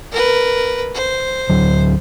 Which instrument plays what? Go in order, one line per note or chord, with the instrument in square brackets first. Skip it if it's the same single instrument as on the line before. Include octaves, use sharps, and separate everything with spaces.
[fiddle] A#4 B4
C5
[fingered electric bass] D2 F#3